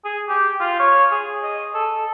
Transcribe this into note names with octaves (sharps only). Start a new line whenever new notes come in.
G#4
G4
F4
C#5
G#4
D#5
A4